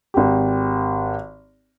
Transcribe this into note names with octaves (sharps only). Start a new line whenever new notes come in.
G#1 G4